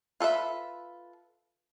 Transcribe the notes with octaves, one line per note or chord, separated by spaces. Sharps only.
F4 A4 B4 E5